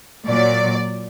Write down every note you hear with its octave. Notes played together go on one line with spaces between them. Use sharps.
A#2 F#3 D5